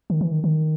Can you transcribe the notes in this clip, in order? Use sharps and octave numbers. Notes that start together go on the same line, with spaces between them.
D#3
E3
D#3
D#3